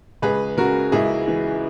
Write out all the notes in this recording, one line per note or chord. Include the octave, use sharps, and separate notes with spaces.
C#2 G#4 B4
C#3 F#4 A#4
C#2 E4 G#4
E3